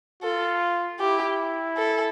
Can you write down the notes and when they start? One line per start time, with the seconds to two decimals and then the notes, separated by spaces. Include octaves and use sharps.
0.23 F4 A4
0.99 E4 G4
1.77 A4